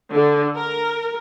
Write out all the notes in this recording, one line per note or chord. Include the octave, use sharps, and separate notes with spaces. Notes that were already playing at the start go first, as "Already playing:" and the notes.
D3
A#4